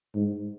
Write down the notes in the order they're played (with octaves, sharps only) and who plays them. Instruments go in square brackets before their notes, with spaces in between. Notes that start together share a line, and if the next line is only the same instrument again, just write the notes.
[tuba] G#2